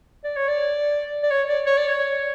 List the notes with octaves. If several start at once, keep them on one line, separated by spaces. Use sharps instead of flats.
D5
C#5
D5
D5
C#5
D5
C#5
D5
C#5